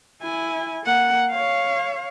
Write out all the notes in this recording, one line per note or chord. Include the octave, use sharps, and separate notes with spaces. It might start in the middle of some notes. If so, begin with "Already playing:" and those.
E4 G#5
A#3 F#5
C#5 F5